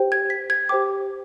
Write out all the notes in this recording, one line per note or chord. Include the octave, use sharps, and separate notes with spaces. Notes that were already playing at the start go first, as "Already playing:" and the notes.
Already playing: G4 C5 G5
G#6
B6
G#6
G4 C5 G5 D6